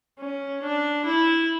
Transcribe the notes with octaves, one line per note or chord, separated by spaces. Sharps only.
C#4
D4
E4